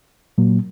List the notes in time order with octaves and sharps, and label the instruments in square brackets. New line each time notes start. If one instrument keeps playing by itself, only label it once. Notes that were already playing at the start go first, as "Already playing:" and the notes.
[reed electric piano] A#2 F#3 A#3